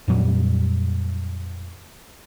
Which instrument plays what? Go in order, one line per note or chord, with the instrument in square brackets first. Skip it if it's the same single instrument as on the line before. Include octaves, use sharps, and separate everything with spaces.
[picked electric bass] F2 A#2 F#3 G3